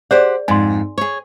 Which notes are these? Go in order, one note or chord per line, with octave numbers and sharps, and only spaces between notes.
G4 G#4 C5 D5 F#5
F2 G#2 G#5 C6
G#4 C#5